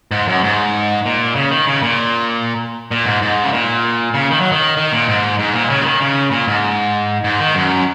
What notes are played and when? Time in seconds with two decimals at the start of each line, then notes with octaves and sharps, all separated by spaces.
0.11 G#2
0.28 F#2
0.43 G#2
1.05 A#2
1.36 C#3
1.51 D#3
1.66 C#3
1.82 A#2
2.91 A#2
3.06 G#2
3.22 G#2
3.44 C#3
3.53 A#2
4.14 C#3
4.31 D#3
4.40 F#3
4.52 D#3
4.77 D#3
4.92 A#2
5.08 G#2
5.39 G#2
5.54 A#2
5.70 C#3
5.81 F#3
5.84 D#3
6.00 C#3
6.31 A#2
6.48 G#2
7.24 G#2
7.40 D#3
7.55 F#2